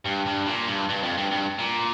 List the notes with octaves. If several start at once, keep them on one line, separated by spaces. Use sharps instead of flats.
G2
G2
A#2
G2
G2
F2
G2
G2
A#2